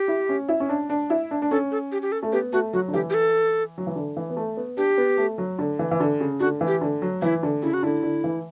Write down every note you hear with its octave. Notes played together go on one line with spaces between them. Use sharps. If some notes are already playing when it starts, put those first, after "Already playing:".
Already playing: G4
E4
C#4
E4
C#4
D4
D4
E4
D4
D4
C#4 A4
A4
G4
G4
A4
A3
B3 G4
A3 F#4
F#3 F#4
D3
E3 G4
G4
A4
F#3
E3
D3
E3
B3
A3
B3
D4 G4
B3
A3
F#3
D3
E3
E3
D3
C#3
D3 F#4
E3
G4
D3
F#3
E3 E4
D3
C#3 E4
F#4
D3 E4
D3
E3